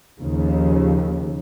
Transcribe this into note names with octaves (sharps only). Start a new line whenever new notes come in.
D#2 C#3 F3